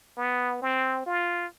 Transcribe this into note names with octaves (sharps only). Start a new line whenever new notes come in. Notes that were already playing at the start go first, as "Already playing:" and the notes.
B3
C4
F4